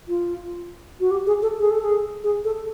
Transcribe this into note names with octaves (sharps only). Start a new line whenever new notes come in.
F4
F#4
G4
G#4
A4
G#4
A4
G#4
G#4
A4